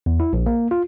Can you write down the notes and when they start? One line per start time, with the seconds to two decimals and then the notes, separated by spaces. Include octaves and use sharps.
0.06 E2
0.20 E4
0.33 A#1
0.46 A#3
0.71 F4